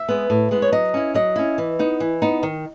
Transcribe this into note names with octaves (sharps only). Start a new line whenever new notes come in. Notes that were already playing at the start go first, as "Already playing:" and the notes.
Already playing: E5
G#3 B3
A2
G#3 B3
C#5
F#3 D#5
C#4 E4
F#3 D#5
C#4 E4
E3
B3 D#4
E3
B3 D#4
D#3